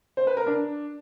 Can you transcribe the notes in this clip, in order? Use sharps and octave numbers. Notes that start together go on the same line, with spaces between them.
C5
B4
A#4
D4